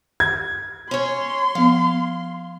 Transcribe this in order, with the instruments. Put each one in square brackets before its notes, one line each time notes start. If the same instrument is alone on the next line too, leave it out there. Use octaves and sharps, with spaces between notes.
[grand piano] G#6
[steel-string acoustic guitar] C#4 C#5 [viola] C6
[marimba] F3 B3 [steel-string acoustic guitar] F5